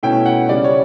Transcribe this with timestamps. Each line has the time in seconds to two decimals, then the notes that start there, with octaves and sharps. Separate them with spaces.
0.03 B2 A3 C#4 E4 G5
0.26 F#5
0.49 C#3 G3 C#4 D5
0.64 C#5